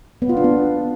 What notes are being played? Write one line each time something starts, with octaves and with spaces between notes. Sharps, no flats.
B3
F4
D4
B3